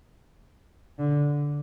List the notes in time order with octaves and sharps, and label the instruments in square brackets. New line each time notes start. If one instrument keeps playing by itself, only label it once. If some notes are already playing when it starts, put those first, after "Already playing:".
[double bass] D3